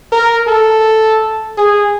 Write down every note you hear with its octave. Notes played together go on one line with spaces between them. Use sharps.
A#4
A4
G#4